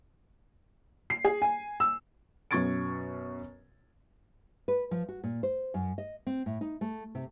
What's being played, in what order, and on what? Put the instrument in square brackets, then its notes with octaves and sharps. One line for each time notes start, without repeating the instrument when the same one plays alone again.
[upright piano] C7
G#4
G#5
E6
[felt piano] F#2 B2 C#6 G#6 A6 D7
[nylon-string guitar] B4
F3
F#4
A#2
C5
F#2
D#5
C4
A2
D#4
A3
C3